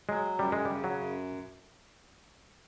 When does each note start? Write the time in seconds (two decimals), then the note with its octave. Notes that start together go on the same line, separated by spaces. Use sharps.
0.09 F#3 G#3
0.39 F#2 G3
0.52 G#3
0.65 C#3 G3
0.84 F#3
0.99 F#2